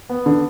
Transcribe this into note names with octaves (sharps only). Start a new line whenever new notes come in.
B3
D3